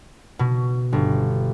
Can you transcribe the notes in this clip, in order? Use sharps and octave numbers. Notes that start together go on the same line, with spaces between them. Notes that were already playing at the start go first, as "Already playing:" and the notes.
B2
G1